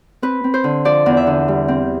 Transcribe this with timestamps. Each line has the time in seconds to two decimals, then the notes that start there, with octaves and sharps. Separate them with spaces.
0.22 C4 B4
0.44 C4
0.54 C5
0.64 D3
0.85 F3 D5
1.06 E2
1.17 E5
1.27 D3
1.48 G3
1.68 C4